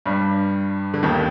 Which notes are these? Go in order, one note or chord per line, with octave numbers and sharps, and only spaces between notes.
G2 G3
D3
D#2 D#3